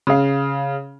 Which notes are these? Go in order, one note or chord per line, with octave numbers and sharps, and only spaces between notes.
C#3 F5